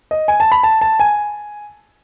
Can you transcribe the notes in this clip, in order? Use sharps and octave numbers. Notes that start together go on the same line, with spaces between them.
D#5
G#5
A5
B5
A5
A5
G#5